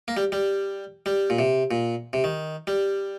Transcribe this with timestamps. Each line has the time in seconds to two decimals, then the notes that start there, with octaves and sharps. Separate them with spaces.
0.08 A#3
0.17 G3
0.32 G3
1.06 G3
1.30 A#2
1.39 C3
1.71 A#2
2.13 C3
2.24 D#3
2.67 G3